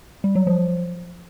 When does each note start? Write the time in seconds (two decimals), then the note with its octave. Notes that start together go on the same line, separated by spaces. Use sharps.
0.24 G3
0.35 F#3
0.47 F3